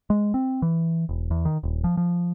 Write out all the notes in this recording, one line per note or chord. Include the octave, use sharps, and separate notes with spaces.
G#3
C4
E3
E1
E2
D#3
D#1
F3
F3